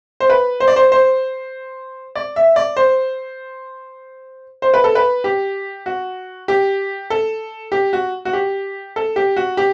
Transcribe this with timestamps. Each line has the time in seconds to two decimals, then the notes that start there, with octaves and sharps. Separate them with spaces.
0.20 C5
0.30 B4
0.60 C5
0.68 D5
0.76 C5
0.92 C5
2.15 D5
2.36 E5
2.56 D5
2.77 C5
4.62 C5
4.74 B4
4.84 A4
4.95 B4
5.24 G4
5.86 F#4
6.48 G4
7.10 A4
7.72 G4
7.93 F#4
8.25 F#4
8.33 G4
8.96 A4
9.16 G4
9.36 F#4
9.57 G4